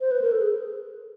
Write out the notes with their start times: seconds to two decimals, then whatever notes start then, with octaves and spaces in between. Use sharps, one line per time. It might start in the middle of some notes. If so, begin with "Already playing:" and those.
0.01 C5
0.11 B4
0.21 A#4
0.32 A4
0.41 G#4